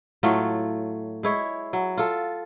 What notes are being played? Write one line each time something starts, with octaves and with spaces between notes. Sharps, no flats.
A2 F#3 A3 F4
G#3 E4 C#5
F#3
F4 A4